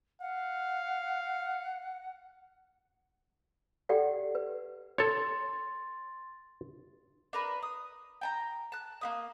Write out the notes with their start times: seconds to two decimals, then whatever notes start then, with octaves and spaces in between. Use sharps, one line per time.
0.21 F5 F#5
3.89 G4 A4 D5 F#5 G5
4.35 B4
4.98 A4 C#5 C6 A6
7.33 D4 A#4 B4
7.63 D#6
8.21 G5 A5 A#5
8.72 A5 F#6
9.01 A#3 E4 D#6